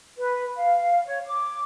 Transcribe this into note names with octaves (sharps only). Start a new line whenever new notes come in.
B4
F5
C#5
D6